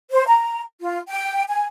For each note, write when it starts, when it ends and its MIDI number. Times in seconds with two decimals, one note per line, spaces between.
0.11 0.25 72
0.27 0.61 82
0.81 0.98 65
1.09 1.43 79
1.49 1.66 80